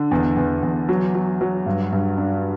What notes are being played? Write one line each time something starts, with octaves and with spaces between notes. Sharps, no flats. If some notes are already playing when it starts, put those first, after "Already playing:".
Already playing: D3
E2
E2
E2
F#3
F#3
F#3
G2
G2
D4